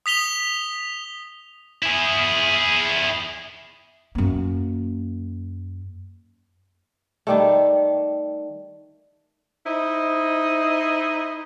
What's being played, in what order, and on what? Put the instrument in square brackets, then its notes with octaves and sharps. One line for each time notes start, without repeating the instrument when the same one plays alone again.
[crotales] D#6 B6 F7 G7
[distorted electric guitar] E4 G#4
[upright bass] F#2 A#3
[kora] D#3 G3 A3
[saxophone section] D#4 E4 C5 D#5